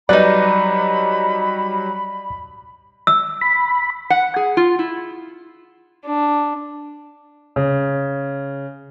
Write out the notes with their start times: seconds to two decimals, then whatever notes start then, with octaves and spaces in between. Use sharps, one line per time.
0.09 F#3 G3 D#4 B4 D5 B5
3.07 E6
3.41 B5
4.10 F#5
4.36 G#4
4.57 F4
4.79 E4
6.04 D4
7.56 C#3